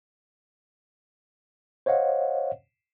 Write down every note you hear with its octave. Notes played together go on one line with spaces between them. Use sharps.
C5 C#5 D#5 F5 F#5